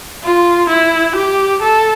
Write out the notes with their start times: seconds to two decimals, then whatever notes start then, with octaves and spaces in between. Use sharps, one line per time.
0.23 F4
0.70 E4
1.16 G4
1.62 A4